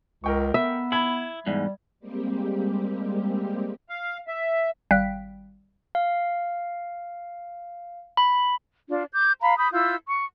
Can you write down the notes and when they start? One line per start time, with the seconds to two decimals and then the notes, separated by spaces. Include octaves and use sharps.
0.24 C#2 A#4 G5 C#6
0.54 B3 E5
0.92 E4 B5 G#6
1.46 E2 G#2 G3
2.00 G3 G#3 A#3 C4 G4
3.89 F5
4.27 E5
4.91 G#1 G3 F5 G5 F#6 B6
5.95 F5
8.17 B5
8.88 D4 F4
9.12 D6 G6
9.42 F5 A#5 B5
9.57 B5 D#6 G6
9.73 E4 F4 E6 G6
10.07 C#6